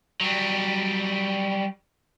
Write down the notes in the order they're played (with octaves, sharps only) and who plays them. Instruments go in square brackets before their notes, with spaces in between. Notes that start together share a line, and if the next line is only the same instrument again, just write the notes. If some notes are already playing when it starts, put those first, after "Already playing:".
[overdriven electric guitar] F#3 G3